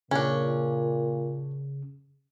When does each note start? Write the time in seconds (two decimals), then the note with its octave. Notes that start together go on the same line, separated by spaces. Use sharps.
0.11 A#2 C#3 C#4 D4